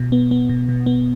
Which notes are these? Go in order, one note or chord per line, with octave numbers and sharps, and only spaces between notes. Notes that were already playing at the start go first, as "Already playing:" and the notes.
Already playing: B2
B3
B3
B2
B2
B3